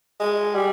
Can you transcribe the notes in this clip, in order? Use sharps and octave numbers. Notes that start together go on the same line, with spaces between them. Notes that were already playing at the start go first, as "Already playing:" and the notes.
G#3
G3